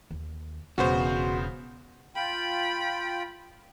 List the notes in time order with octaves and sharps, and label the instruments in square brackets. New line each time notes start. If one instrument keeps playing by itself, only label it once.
[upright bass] D#2
[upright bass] E1 [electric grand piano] C#3 B3 C5 [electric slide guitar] F#4
[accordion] F4 G5 [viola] B5